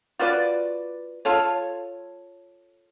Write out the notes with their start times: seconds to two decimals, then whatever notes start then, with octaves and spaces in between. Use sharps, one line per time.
0.19 F4 F#4 B4 D5
1.25 F4 A4 C#5